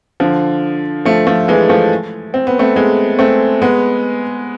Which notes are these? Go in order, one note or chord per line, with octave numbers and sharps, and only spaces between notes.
D3 F3
F3 A3
F3 A3
E3 G#3
F3 A3
C4
B3
A3 C4
G#3 B3
A3 C4
G#3 B3